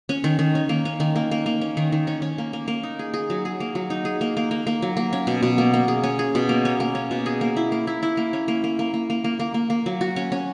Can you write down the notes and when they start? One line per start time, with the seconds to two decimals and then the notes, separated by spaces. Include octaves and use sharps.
0.09 C#4
0.24 D#3
0.39 D#3
0.55 C#4
0.69 A#3
0.85 C#4
1.00 D#3
1.16 A#3
1.31 A#3
1.46 A#3
1.61 C#4
1.77 D#3
1.92 D#3
2.07 C#4
2.22 C#4
2.38 A#3
2.53 A#3
2.68 A#3
2.83 D#4
2.99 G#4
3.14 G#4
3.30 F#3
3.45 G#4
3.60 A#3
3.75 F#3
3.90 D#4
4.05 G#4
4.21 A#3
4.37 A#3
4.51 A#3
4.67 A#3
4.82 F#3
4.97 A#3
5.13 C#4
5.27 B2
5.43 B2
5.58 A#3
5.74 A#3
5.88 G#4
6.04 C#4
6.19 G#4
6.35 B2
6.49 A#3
6.65 C#4
6.80 A#3
6.95 C#4
7.11 B2
7.26 G#4
7.41 A#3
7.56 E4
7.72 A#3
7.87 E4
8.03 E4
8.17 A#3
8.33 C#4
8.48 A#3
8.64 A#3
8.79 A#3
8.94 A#3
9.10 A#3
9.24 A#3
9.39 A#3
9.54 A#3
9.70 A#3
9.86 F#3
10.01 F#4
10.16 C#4
10.32 C#4